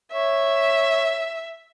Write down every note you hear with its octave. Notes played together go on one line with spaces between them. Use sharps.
C#5 E5